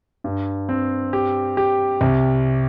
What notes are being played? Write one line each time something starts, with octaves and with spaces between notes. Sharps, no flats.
G2
C4
G4
G4
C2